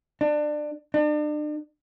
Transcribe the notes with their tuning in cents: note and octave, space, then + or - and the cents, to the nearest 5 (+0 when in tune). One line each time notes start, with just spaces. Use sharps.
D4 +25
D4 +40